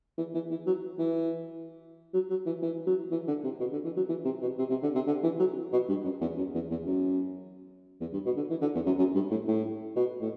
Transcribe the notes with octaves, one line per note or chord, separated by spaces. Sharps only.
E3
E3
E3
F#3
E3
F#3
F#3
E3
E3
F#3
E3
D3
C3
B2
D3
E3
F#3
E3
C3
B2
C3
C3
D3
C3
D3
E3
F#3
B2
G2
F#2
E2
F#2
E2
E2
F#2
E2
G2
B2
D3
E3
D3
E2
F#2
F#2
G2
A2
A2
B2
A2